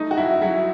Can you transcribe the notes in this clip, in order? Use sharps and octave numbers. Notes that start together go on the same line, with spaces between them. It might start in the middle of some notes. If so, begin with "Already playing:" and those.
Already playing: A3 D#4
F#4
F#2 E4
F#3 E4